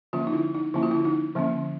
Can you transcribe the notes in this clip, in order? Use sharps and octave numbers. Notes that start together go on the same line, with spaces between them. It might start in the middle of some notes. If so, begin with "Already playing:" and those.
D3 F3 A#3 C#4 F4
D#4
E4
D#4
D3 F3 A#3 C#4 E4
F4
E4
D#4
D3 F3 A#3 C#4